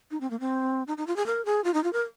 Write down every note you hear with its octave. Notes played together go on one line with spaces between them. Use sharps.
D#4
C4
A#3
C4
D#4
D#4
F4
G#4
A#4
G#4
F4
D#4
F4
A#4